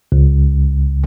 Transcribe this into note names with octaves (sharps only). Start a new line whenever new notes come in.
C#2